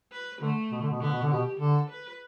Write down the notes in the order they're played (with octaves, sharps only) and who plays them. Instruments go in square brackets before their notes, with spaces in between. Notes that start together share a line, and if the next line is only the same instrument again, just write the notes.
[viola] B4
[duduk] D3 [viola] A3
[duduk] B2
D3
B2
[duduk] D3 [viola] B3
[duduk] B2
D3
[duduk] B2 [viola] G4
[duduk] D3 [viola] A4
[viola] B4